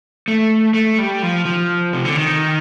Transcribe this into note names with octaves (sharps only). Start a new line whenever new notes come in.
A3
A3
G3
F3
F3
C3
D3
D#3